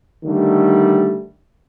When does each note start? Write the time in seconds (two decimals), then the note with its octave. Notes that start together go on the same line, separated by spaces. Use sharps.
0.24 D3 D#3 G3 A3